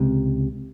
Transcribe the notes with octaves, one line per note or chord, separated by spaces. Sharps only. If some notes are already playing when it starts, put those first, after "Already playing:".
Already playing: C#2 C3